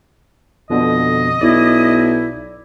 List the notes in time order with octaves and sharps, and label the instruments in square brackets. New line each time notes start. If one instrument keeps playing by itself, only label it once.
[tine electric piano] F2 B2 D3 [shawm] D#5
[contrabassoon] B1 [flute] E4 [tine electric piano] D5